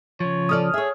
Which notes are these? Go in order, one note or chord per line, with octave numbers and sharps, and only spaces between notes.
C#3 F3 C#5
C#4 A4 D5 D#6 F6
G#4 C#5 E5